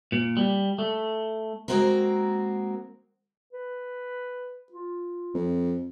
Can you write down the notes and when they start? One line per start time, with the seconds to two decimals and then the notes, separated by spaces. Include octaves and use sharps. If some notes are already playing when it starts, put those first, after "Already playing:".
0.12 A#2
0.37 G3
0.79 A3
1.68 G#3 A#3 C4 F#4 A#4
3.53 B4
4.72 F4
5.35 F2